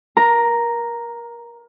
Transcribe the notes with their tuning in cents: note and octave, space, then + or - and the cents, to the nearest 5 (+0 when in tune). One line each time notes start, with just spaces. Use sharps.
A#4 +25 A#5 +0